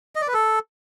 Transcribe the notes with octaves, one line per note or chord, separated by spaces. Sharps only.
D#5
D5
B4
A4